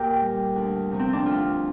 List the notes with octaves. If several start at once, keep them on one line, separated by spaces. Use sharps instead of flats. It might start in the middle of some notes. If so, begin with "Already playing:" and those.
Already playing: A#2 G4 A#4
G3
D2
C3 F3
C4
D4
D2 F4